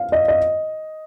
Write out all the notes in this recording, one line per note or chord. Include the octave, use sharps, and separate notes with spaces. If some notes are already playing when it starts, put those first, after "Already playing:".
Already playing: F5
D#5
D#5